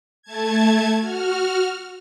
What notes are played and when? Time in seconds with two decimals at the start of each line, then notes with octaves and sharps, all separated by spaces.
0.22 A3 A5 G#6
1.00 F#4 F6